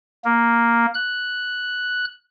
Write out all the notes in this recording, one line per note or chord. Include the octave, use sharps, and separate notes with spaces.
A#3
F#6